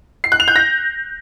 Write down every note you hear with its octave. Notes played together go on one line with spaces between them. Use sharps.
C7
F#6
F7
G6
A#6